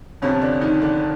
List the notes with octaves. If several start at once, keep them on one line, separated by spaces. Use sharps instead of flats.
G1 F2 C3 F3 C#4
D3 D4
D#3 D#4
D3 D4